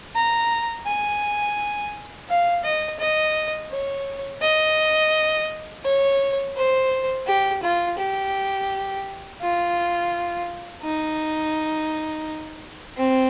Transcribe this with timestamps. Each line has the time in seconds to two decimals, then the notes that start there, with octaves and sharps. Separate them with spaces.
0.15 A#5
0.86 G#5
2.29 F5
2.64 D#5
3.00 D#5
3.71 C#5
4.42 D#5
5.85 C#5
6.56 C5
7.27 G4
7.63 F4
7.98 G4
9.41 F4
10.83 D#4
12.97 C4